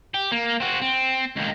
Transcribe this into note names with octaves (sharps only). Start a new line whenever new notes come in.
G4
A#3
C4 F#4
C4
C#2 D#3